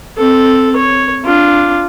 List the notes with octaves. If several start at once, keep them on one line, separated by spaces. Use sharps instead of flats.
C4 A4
C#5
D4 F4